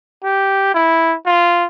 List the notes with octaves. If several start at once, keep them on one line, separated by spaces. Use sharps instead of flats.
G4
E4
F4